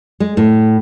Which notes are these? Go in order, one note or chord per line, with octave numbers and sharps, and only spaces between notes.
G#3
A2